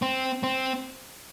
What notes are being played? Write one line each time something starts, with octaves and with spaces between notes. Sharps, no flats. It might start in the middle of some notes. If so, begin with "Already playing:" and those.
C4
C4